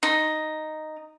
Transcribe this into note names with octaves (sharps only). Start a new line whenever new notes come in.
D#4